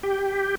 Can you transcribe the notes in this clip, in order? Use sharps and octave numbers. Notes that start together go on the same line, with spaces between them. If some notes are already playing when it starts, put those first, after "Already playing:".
G4